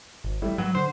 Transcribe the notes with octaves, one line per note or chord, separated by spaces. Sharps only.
G#1
A1 G3 A3 E4
G#2 F#3 B4 F#5
D3 C5